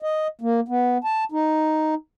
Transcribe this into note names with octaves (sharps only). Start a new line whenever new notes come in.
D#5
A#3
B3
A5
D#4